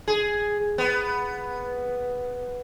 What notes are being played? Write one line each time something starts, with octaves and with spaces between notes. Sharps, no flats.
G#4
B3